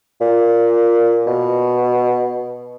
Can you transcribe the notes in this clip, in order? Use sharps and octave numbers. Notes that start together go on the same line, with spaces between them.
A#2
B2